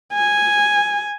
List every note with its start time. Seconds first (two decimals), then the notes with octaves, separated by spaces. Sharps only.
0.13 G#5